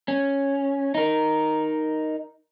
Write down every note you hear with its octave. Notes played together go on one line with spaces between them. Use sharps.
C#4
D#4 A#4